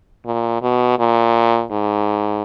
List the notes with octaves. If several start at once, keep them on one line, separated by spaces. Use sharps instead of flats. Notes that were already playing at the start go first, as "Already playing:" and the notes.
A#2
B2
A#2
G#2